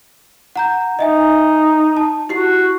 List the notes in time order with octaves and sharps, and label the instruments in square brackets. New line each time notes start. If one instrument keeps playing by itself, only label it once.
[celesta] F#5 A#5 G6
[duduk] D#4 [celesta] D#5 E5 G#5
[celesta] A5
[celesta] E4 G4 C7 [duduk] F#4